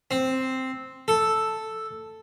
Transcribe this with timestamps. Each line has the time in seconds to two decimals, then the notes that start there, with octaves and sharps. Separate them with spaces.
0.11 C4
1.08 A4